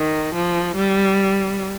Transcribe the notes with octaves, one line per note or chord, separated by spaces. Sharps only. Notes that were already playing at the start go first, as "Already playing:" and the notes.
Already playing: D#3
F3
G3